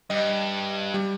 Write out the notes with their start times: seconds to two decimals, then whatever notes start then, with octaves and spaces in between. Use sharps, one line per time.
0.10 G2 D#5
0.94 G3